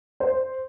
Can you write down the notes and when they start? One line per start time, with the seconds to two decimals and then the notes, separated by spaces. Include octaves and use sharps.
0.20 C5